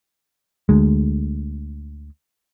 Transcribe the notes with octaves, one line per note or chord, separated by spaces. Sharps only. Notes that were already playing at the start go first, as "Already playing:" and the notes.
D2 G#3